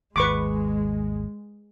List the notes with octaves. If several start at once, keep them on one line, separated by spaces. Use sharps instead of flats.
G#1 D#2 G#3 B4 C#6 D6